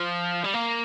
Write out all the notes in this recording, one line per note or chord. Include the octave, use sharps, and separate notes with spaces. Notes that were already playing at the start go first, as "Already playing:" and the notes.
Already playing: F3
G3
A#3